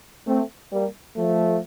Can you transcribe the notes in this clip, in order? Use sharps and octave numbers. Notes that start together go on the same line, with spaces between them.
A3 C4
G3 A#3
F3 A3